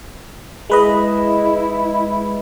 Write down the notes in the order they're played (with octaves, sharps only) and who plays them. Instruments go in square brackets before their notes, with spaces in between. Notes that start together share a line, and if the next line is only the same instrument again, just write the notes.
[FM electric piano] G#3 B4 D#5 [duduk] E4